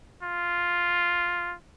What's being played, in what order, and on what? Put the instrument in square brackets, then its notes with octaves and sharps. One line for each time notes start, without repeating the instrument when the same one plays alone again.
[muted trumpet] F4